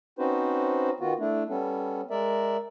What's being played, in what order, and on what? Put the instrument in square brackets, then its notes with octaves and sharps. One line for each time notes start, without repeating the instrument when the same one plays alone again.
[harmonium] C4 C#4 D#4 F#4 B4 C5
D#3 B3 F4 F#4
A3 D4 E4
G3 B3 C#4 A4
G#3 A#4 D5 E5